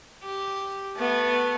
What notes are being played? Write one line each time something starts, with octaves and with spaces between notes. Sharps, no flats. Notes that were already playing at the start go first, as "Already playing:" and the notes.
G4
A3 B3